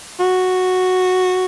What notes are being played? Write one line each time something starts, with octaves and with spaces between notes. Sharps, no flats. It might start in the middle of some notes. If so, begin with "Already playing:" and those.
F#4